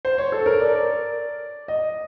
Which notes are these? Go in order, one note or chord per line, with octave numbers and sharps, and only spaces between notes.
C5
C#5
A4
A#4
D5
D#5